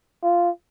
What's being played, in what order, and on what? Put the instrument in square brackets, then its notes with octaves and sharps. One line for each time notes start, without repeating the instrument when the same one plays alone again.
[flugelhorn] F4